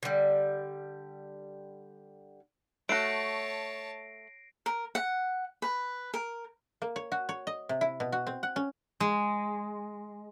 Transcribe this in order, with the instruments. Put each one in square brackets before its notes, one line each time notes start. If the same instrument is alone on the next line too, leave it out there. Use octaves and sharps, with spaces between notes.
[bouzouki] D3 G3
[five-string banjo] A3 F#4 [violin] C#5 A5 [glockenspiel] A#6 C7 D7
[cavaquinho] A#4
F#5
B4
A#4
[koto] A#3
C#5
F#4
C#5
D#5
C3
E4
B2
F#4
C4
F#5
C#4
[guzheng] G#3